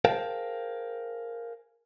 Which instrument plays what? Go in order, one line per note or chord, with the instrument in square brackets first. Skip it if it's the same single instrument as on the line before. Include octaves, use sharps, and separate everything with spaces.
[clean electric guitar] G#4 A#4 C5 F5 G5 A5